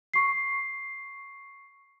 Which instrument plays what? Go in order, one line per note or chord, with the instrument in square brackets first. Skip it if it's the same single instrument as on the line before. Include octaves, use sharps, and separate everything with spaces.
[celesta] C#6 C7